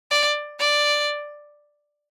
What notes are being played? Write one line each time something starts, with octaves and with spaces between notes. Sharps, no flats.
D5
D5